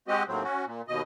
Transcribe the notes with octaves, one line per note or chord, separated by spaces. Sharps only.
G#3 C4 F#4 G4 D#5
D#2 A2 F#3 C4
C#4 F#4
A#2
D#2 B2 D#5